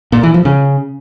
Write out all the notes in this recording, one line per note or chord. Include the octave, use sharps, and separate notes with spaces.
A#2
E3
F3
C#3